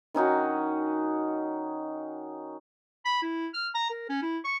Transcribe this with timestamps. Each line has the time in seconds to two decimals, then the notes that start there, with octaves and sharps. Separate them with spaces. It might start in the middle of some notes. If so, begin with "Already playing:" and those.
0.14 D#3 C#4 D#4 F#4
3.05 B5
3.22 E4
3.54 F6
3.75 A#5
3.90 A#4
4.09 C#4
4.22 E4
4.45 C#6